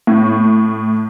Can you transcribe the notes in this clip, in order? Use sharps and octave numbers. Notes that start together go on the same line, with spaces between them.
A2